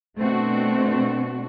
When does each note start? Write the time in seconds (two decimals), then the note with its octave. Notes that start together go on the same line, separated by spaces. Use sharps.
0.18 B2 A3 C4 D4 F#4